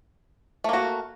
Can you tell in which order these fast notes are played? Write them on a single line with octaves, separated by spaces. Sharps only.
A3 A#3 F#4